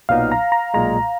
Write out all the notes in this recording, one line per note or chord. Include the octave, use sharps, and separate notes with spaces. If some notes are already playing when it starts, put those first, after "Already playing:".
B1 A#2 F#3 B3 D#4 F5
A#5
A#5
B1 A#2 G#3 A#5